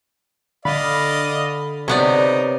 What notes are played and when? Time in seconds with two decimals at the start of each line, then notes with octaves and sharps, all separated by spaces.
0.65 D3 D5 D#5 F5 B5
1.88 C3 B3 D#4 C#5 D5